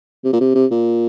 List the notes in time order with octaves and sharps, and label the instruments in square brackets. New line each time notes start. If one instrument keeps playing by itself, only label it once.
[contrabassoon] C3
A#2
C3
C3
A#2